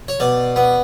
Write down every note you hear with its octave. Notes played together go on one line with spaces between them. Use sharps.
C#5
B2 D5
B3